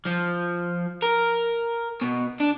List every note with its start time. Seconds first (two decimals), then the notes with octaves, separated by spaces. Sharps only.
0.05 F3
1.02 A#4
2.02 B2
2.40 D4